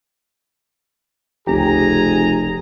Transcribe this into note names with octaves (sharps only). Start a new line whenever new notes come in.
F1 C#2 G4 G#4 G#5 A#5